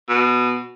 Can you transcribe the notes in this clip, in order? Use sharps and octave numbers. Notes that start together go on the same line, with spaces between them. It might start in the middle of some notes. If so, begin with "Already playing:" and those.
B2